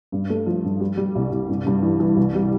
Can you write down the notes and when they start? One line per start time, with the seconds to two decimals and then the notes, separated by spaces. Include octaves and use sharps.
0.12 G2
0.30 A3
0.46 F3
0.64 G2
0.80 G3
0.97 G3
1.15 C2
1.31 C2
1.49 G2
1.66 G2
1.82 E3
2.00 E3
2.17 C2
2.35 G3